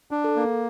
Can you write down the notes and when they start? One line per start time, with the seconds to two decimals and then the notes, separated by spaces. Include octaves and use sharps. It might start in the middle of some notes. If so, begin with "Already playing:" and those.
0.11 D4
0.24 A4
0.36 A#3